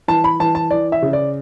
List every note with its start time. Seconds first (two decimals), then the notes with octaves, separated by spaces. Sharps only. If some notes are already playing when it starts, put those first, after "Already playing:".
0.08 E3 A5
0.24 B5
0.40 E3 A5
0.55 A5
0.71 E3 D5
0.92 E5
1.02 C#3
1.13 D5